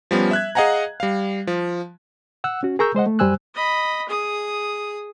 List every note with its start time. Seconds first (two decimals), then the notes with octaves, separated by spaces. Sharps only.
0.11 F3 G3 B3 C#4
0.31 E5 F#6 G#6
0.55 G#4 D#5 F5 F#5 G#5 A#5
1.00 G3 F5
1.47 F3
2.44 F#5 E6 F#6
2.63 C#4 F#4
2.79 G#4 A#4 A#5 C#6 E6 G6
2.95 G#3 C5 D#5 F#5
3.06 A3
3.19 F#2 G3 C5 G#5 E6 F#6
3.54 D#5 B5
4.09 G#4 D#6